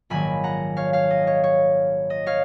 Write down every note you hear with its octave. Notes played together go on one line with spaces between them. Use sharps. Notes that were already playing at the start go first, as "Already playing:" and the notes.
A#1 G#2 D#3 F#3 A#3 G#5 B5
F#5 A#5
C#5 F5
C#5 F5
D#5
C#5
C#5
D#5
C#5 F5